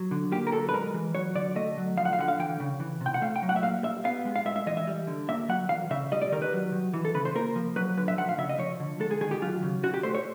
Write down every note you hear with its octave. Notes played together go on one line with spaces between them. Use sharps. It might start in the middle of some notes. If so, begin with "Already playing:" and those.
Already playing: F#3
D3
A#3 G4
A#4
F#3 A4
B4
G#3 A#4
E3
F#3 C#5
D3 D5
A3 D#5
F#3
F3 F5
F#5
F5
D3 F#5
F5
E3 G5
C#3
E3
C3
G5
F#5
A3 F5
G5
F#3
F#5
E5
A#3 F5
G3 E5
B3 F5
G#3
F5
G#3 E5
E5
E3 D#5
E5
G3
D3
A#3 E5
F#3 F#5
E3 F5
C#3 E5
G3 D#5
D5
D#3 A#4
B4
F#3
D#3
E3
A4
C#3 B4
C5
A#3 A#4
F3
F#3 B4
D3 B4
E5
F3 F#5
F5
C#3 E5
D#5
F3 C#5
D3
G#3 A4
G#4
D#3 G#4
G4
F#3 F4
C#3
C#4 F#4
G4
A3 C5
C#5